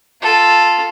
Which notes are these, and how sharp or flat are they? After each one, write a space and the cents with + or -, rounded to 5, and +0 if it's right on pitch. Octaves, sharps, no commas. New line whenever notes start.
F4 +0 A4 +0